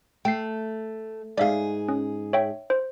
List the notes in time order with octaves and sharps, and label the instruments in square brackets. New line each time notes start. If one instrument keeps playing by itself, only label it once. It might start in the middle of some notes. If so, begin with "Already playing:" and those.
[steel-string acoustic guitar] A3 [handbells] G5 C7
[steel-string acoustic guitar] G#2 G#4 [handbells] D5 E5 F5
[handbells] C#4
C#5 E5 G5
C5